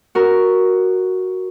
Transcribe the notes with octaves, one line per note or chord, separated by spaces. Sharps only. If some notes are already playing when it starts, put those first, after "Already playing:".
F#4 A#4